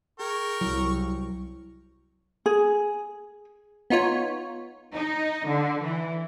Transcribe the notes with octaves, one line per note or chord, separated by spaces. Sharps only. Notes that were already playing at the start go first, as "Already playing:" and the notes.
G#4 A#4 G5 C#6
C2 F#3 E4
G#4
B3 D#4 F4 C#5
D#4
D3
E3